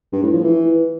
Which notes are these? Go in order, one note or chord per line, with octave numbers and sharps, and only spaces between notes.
G2
A2
F3
E3